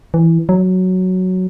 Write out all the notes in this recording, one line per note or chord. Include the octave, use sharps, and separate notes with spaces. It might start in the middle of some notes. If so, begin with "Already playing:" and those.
E3
F#3